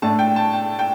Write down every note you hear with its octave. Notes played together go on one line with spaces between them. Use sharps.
A2 A3 D4 A5
G5
A5
G5
G5